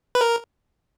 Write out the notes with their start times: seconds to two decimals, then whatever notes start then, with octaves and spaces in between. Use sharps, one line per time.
0.15 B4
0.21 A#4